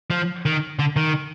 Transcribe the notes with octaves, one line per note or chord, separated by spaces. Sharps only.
F3
D#3
D3
D#3